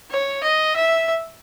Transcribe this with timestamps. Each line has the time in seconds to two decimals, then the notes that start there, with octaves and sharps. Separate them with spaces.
0.11 C#5
0.43 D#5
0.76 E5